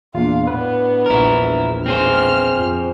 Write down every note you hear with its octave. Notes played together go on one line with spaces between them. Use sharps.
E2 A#2 D4 F4 F5
A2 B3 D4 B4
A#1 E2 E4 A#4
C4 G#4 C5 F6
F2